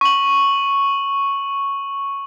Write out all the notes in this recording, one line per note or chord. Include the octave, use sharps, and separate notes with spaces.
C#6 F#7